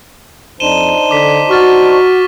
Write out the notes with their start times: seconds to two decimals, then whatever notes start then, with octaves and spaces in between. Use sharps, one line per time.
0.60 F2 D4 D#4 C5 D#7 E7 G7
1.11 D3 D6 B6
1.49 F#4 C#6 F6 A6
1.89 C#6